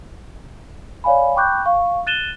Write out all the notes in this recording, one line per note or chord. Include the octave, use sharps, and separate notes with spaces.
C#5 D5 F5 G#5 B5
G5 B5 C#6 D6 F#6 G6
F5 C#6
F#6 A6 D#7 E7 G7